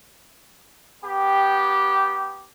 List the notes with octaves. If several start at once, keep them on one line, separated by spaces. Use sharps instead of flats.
B3 G4